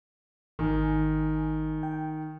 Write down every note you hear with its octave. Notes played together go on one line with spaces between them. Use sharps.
G#1 D#3 G#5
G5